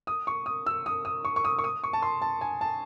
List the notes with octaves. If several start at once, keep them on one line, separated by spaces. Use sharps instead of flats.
D#6
C#6
D#6
E6
D#6
D#6
C#6
C#6
D#6
C#6
D#6
C#6
A5
C6
A5
G#5
A5